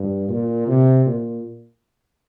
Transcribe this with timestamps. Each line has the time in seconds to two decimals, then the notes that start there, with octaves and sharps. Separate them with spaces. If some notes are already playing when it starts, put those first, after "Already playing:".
Already playing: G2
0.29 A#2
0.67 C3
1.06 A#2